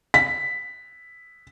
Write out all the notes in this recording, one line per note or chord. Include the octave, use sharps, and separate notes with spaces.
B6